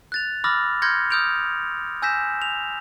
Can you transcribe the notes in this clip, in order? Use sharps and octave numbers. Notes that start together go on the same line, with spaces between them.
F#6 A6 F7
B5 D6 E6 F6 A6 A#6
C6 F6 G6 G#6 A#6 C#7
D#6 F6 G6 D7 F7
G#5 E6 G6 A#6 B6 E7
F7